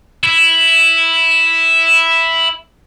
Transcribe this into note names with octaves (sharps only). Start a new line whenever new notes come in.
E4 E5